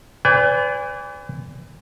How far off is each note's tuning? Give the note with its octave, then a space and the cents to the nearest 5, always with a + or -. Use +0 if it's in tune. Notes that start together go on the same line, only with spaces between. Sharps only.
B4 +35 D5 -35 G#5 -35